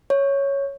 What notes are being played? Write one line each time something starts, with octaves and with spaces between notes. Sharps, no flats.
C#5